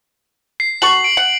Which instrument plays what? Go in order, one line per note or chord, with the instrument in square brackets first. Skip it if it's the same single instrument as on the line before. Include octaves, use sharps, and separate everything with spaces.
[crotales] C7
[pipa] F#4 A4 C#6 [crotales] F#7
[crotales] D7
[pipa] F#5